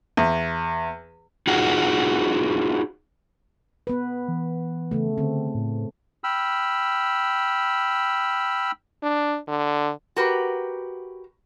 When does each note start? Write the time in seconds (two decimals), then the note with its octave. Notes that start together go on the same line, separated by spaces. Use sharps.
0.17 E2
1.47 D#4 F4 F#4 G#4
3.87 B3 B4
4.28 E3
4.91 C#3 A3
5.18 D3 C4
5.55 A2
6.24 G5 B5 E6 F6
9.03 D4
9.48 D3
10.16 F#4 G4 A#4 B4